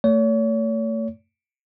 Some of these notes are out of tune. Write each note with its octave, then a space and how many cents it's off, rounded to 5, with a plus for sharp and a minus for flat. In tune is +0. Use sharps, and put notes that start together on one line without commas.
A3 +30 C#5 +40